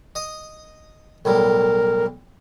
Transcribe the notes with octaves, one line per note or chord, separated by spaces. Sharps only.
D#5 D#6
B1 A2 G3 A#4